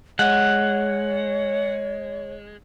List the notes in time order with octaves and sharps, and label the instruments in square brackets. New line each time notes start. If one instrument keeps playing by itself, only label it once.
[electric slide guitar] G#3 [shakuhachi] C#5 [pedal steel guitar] F#5